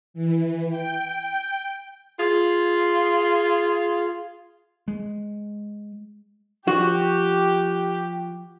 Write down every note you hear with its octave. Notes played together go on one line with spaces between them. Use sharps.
E3
G5
F4 G#4
G#3
F3 F#4 G4